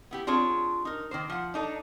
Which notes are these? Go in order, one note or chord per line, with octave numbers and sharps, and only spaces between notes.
B3 E4 G4
C4 D4 F4 G#4 C#5
D#4 A#4
D#3 A#3 C5
F3 F#5
D4 D#4 A4